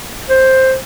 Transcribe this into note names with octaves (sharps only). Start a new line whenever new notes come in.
C5